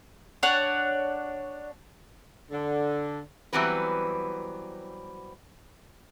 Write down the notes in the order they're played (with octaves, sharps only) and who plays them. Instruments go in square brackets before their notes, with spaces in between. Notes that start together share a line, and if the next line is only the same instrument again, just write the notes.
[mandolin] D4 C#5 F#5
[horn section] D3
[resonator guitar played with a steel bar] E3 F#3 G3 B3 C4 B4